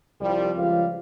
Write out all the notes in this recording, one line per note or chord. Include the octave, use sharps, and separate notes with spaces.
C2 F3 G3
C#2 F3 G3 C5 F5